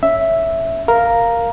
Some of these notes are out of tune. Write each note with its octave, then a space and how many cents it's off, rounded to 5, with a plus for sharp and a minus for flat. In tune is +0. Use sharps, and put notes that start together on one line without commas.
C#4 +10 E5 +0
A#4 +0 F5 +0 A#5 +0